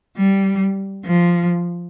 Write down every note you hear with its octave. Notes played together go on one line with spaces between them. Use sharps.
G3
F3